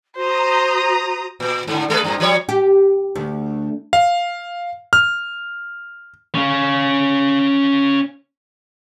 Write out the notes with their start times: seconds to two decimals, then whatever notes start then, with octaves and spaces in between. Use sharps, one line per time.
0.16 F#4 C5 A#5 D#6
1.40 A#2
1.67 G#2 D3
1.90 G#3 G#4 B4
2.04 G2 A#2
2.20 F3 G3 C#5
2.49 G4
3.15 D2
3.93 F5
4.93 F6
6.35 C#4 F5